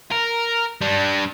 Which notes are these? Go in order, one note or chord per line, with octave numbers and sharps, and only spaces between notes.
A#4
G3 D4